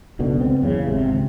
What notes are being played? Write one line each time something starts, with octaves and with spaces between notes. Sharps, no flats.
F#1 B1 B2 D3
C#2 B3 C4
F#1 E2 G2 C#3
G#1 C3
C#2